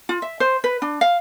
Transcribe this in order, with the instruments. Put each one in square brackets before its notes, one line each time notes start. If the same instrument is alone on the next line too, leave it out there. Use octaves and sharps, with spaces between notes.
[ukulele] F4
E5
C5
B4
D4
F5